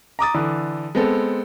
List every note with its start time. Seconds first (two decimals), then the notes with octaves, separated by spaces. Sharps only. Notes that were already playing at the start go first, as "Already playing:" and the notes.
0.19 A#5 D6 D#6 A6
0.34 D3 E3
0.95 G#3 B3 C4 A4